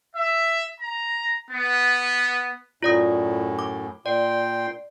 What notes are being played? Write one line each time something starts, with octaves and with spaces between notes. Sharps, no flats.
E5
A#5
B3
F#2 A2 F4 D5 D#6
D6
A#2 D5 G5 C6